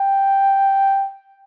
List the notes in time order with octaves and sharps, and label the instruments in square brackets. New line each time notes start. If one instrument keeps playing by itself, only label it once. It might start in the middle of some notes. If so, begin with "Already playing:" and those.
Already playing: [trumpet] G5